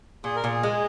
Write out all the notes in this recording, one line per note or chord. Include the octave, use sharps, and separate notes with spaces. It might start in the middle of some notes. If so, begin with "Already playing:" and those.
A#2 G#4
A#4
A#2 G#4
G#3